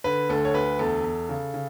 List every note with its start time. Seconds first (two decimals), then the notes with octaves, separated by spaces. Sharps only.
0.04 D3 B4
0.29 D2 A4
0.45 C#5
0.54 D2 B4
0.79 E2 A4
1.04 E2
1.29 C#3
1.54 C#3